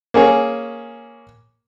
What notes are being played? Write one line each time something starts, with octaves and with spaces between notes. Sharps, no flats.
A#3 C#4 G#4 C#5